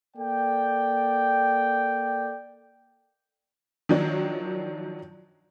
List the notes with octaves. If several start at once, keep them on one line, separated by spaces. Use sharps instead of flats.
A#3 A4 D5 G5
D#3 F3 F#3 D4